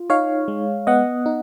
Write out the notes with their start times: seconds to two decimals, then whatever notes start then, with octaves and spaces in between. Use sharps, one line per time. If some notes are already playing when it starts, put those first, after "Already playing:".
Already playing: F4
0.10 D#4 C#5 F5
0.48 G#3
0.87 B3 D#5 F#5
1.26 D#4